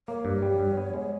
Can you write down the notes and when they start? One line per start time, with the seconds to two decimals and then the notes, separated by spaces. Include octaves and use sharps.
0.08 A#3 C#5
0.25 G2
0.42 G3
0.60 G2
0.77 B3
0.93 G#3